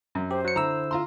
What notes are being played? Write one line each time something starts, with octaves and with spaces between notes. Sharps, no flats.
F#2
G4 C5
F#3 C#7
D3 E4 A#5 E6
F4 A#5 C6